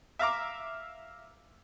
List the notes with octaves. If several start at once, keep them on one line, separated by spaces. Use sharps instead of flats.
E5 F5 A#5 D6